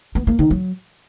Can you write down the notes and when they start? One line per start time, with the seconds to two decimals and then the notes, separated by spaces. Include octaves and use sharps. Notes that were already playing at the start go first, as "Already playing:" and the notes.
0.15 B3
0.27 A#3
0.39 D#3
0.51 F#3